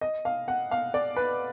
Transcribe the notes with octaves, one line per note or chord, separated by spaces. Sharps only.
D#5
F5
F#5
F5
D5
B4